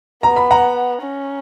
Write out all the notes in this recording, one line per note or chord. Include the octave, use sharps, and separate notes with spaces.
B3 A#5
B5
F#5 A#5
C#4